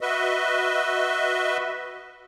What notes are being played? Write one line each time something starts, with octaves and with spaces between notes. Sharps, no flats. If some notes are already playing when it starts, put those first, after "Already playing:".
F#4 B4 D#5 E5